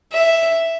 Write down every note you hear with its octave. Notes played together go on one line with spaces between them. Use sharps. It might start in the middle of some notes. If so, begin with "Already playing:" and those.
E5